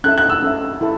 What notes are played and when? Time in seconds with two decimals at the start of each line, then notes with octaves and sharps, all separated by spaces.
0.04 C#4 A4 E5 F#6
0.18 F#6
0.30 E6
0.42 C#4 A4 E5
0.81 E4 A4